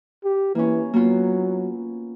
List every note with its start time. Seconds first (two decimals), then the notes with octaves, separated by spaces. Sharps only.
0.24 G4
0.55 E3 A#3 C#4
0.94 F#3 A#3 B3 F4